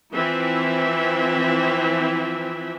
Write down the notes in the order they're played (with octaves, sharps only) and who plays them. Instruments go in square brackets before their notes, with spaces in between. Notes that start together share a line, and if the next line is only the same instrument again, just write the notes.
[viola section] E3 F3 C4 E4 E5